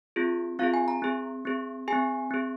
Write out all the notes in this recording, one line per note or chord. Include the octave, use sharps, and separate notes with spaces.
C4 F4 G#4
C4 F4 G#4 F5
G#5
A#5
C4 G#4
C4 G#4
C4 G#4 G#5
C4 G#4